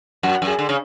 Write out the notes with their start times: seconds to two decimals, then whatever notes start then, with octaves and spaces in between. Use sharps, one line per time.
0.23 F#2 F#4 F#5
0.42 F#2
0.47 G#4 G#5
0.59 D3
0.69 C#3